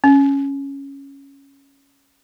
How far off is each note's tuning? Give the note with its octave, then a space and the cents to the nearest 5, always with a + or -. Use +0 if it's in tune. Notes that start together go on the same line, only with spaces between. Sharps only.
C#4 +0